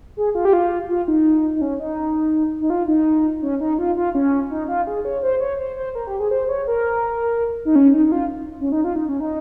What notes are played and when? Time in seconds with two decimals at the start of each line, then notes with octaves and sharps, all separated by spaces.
0.17 G#4
0.35 F4
0.45 G4
0.53 F4
0.89 F4
1.08 D#4
1.56 D#4
1.61 C#4
1.80 D#4
2.61 D#4
2.70 F4
2.88 D#4
3.42 C#4
3.61 D#4
3.79 F4
3.97 F4
4.15 C#4
4.51 D#4
4.68 F4
4.87 G#4
5.05 C#5
5.23 C5
5.40 C#5
5.59 C5
5.77 C5
5.95 A#4
6.07 G4
6.20 G#4
6.31 C5
6.49 C#5
6.68 A#4
7.65 D#4
7.76 C#4
7.94 D#4
8.06 D#4
8.12 F4
8.60 C#4
8.72 D#4
8.84 F4
8.96 D#4
9.09 C#4
9.20 D#4